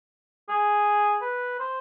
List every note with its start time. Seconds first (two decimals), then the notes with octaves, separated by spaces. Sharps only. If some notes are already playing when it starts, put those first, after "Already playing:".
0.49 G#4
1.21 B4
1.59 C5